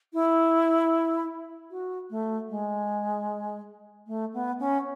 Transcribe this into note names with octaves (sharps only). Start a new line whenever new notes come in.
E4
F#4
A3
G#3
A3
B3
C#4